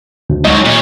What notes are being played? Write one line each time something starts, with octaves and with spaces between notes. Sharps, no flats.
D2
G#2 F#3 D#5
A#2 C#4